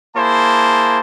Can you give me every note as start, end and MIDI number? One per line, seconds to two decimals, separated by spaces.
0.16 1.00 58
0.16 1.00 64
0.16 1.00 68
0.16 1.00 72
0.16 1.00 81